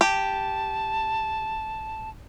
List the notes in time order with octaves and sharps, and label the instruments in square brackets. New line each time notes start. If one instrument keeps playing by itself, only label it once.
[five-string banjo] G4 [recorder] A5